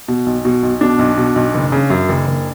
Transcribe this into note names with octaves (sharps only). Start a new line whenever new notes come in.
B2
B1
B2
B1
B2 D4
B1
B2
B1
F#1
C#3
F#2
F#1
F#1